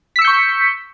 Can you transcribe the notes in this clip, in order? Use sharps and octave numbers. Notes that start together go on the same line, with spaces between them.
C#6 E6 G6 B6 C#7